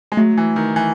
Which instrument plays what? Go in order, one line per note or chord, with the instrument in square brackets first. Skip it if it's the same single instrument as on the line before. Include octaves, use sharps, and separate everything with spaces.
[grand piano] G#3
[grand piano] F#3 [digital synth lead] A3
[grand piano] E3
D#3
E3